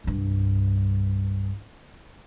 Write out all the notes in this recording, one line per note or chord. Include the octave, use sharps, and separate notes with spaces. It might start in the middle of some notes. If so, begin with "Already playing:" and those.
C2 G2